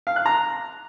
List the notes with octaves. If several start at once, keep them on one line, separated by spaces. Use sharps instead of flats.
F5
F#6
A#5